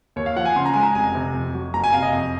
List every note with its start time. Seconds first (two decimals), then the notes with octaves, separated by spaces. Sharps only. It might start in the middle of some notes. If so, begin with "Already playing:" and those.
0.16 D#2 C#5
0.26 F5
0.36 F3 F#5
0.45 G#5
0.56 C#3 C6
0.65 A#5
0.74 G#3 G#5
0.83 A#5
0.95 F1 G#5
1.15 C3
1.34 F2
1.54 F#3
1.74 F#1 A#5
1.84 G#5
1.93 C3 F5
2.02 D#5
2.13 F2